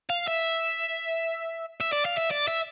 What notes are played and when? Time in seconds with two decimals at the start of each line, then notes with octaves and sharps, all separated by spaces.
0.10 F5
0.28 E5
1.81 E5
1.93 D5
2.06 F5
2.18 E5
2.31 D5
2.48 E5